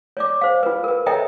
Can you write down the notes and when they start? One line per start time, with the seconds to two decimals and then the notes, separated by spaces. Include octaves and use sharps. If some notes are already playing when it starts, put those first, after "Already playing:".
0.17 C#5 D5 D6
0.41 C5 F5
0.63 F4 B4
0.84 A#4 B4
1.06 A4 C#5 D#5 E5 G5 A#5